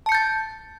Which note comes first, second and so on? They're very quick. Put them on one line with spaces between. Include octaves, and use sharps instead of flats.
A5 C#7 G6 A6